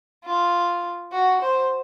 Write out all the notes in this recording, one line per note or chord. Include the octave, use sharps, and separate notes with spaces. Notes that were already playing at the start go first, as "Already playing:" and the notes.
F4
F#4
C5